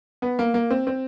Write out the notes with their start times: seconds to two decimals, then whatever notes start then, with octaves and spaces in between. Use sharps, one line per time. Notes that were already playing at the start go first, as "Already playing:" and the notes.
0.22 B3
0.39 A#3
0.54 A#3
0.71 C4
0.87 C4